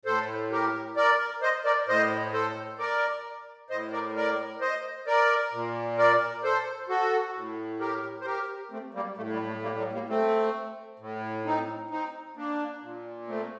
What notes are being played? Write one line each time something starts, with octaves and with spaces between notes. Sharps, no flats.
A2 A4 C5
G4 A#4
A#4 D5
C5 D#5
A#4 D5
A2 C5 D#5
A4 C5
A#4 D5
A2 C5 D#5
A#4 D5
A#4 D5
C5 D#5
A#4 D5
A#2
A#4 D5
A4 C5
F#4 A4
A2
G4 A#4
C5
G4 A#4
A3 C4
G3 A#3
A2 A3
G3
A3
G3 A#3
G3 A#3
G3 A#3
A3 C4
A2
C4 D#4
C4 D#4
A#3 D4
A#2
A3 C4